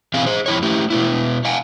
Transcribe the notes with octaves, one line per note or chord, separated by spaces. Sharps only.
B2 E3 C4 G#4 F5 G#5
G#4 C5
F2 E4 C#5
A3 E4 G4
B2 B3 E4
F5 F#5 G#5